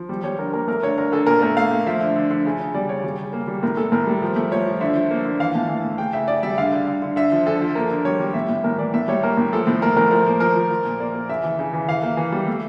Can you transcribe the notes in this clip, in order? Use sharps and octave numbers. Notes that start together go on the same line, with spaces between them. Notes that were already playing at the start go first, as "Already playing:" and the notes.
Already playing: F3
G3
G3 C#5
D3 A#4
A#3 A#4
A3 A#4
D3 C#5
D3 A#4
D3 A4
A#2 A#4
A3 A#4
A3 F5
A3
F3 E5
D3
D3
D3
C#3
C#3
G3 D5
C#3 C#5
G3
C#3
A#3
G3
A2 A#4
A2 A4
A2 A#4
G3
F3
A3
F3 C#5
F3
D3 E5
F3
A#3
D3
E3 F5
A2 A5
E3
A3
C#3 G5
C#3 E5
C#3 D5
G3 E5
D3 F5
D3
D3
D3
D3 E5
F3
D3 A4
F3
A#3 A#4
D3
G3 C#5
G3
A2 E5
A2
A2 A#4
E3 D5
A2 E5
G3 C#5
A#3 A#4
A2
F3 A4
A2
A#3 A#4
A2 A#4
F3 A#4
A#3
F3 A#4
F3
F3
A#2
A#3 D5
A#3
C#3 E5
E3
C#3
E3
E3 F5
A#3
E3
G3
A3